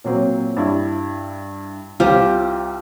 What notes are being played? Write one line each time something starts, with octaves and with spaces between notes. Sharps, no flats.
A#2 F#3 C4
G2 E4
C2 F4 G4 C5